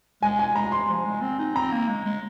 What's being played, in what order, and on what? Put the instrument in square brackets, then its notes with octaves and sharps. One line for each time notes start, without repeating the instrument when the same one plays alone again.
[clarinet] G#3 [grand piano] G#5
[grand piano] G#5
[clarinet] G#3 [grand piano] A#5
[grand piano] C6
[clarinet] F3
G#3
C4
D#4
[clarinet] C4 [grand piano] A#5
[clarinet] A#3
G#3
G#3